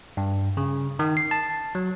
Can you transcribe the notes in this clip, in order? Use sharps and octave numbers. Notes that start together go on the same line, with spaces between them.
G2
C#3
D#3
C7
A5
F#3